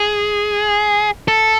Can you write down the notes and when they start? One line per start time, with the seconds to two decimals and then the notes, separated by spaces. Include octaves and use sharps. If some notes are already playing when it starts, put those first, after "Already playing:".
Already playing: G#4
1.28 A4